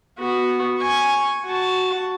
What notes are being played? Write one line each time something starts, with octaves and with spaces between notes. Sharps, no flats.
B3 F#4
G#5 C#6
F#4 A5